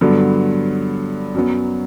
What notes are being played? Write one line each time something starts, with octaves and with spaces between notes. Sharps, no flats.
G2 D3 F#3 B3
F#2 F#3 B3